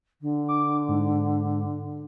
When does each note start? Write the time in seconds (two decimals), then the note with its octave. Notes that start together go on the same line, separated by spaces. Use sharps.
0.21 D3
0.48 D6
0.88 G#2